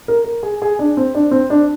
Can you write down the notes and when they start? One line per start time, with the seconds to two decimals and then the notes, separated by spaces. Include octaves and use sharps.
0.08 A#4
0.24 A#4
0.43 G#4
0.62 G#4
0.79 D4
0.97 C4
1.15 D4
1.31 C4
1.50 D4